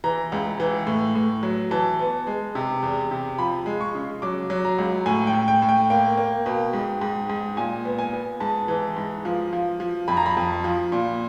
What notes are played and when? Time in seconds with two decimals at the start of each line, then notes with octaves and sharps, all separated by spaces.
0.04 E3 A#5
0.32 C#2
0.60 E3
0.87 A2
1.15 A2
1.43 F#3
1.71 E3 A5
2.00 B3
2.27 G#3
2.55 C3
2.83 E2
3.11 C3
3.38 F3 B5
3.66 G#3
3.81 C#6
3.95 C#3
4.22 F#3 D6
4.50 F#3
4.65 A#5
4.78 C#2
5.06 A2 G#5
5.27 G5
5.33 A2
5.48 G5
5.62 A2
5.69 G5
5.90 A#3 G5
6.17 A#3
6.46 B2
6.73 G#2
7.01 G#2
7.29 G#2
7.57 A#2 G#5
7.85 B3
7.99 G#5
8.13 B3
8.40 G#2 A5
8.68 E3
8.96 G#2
9.25 F3
9.53 F3
9.80 F3
10.08 F2 B5
10.17 A#5
10.26 B5
10.37 F2
10.64 F3
10.92 A#2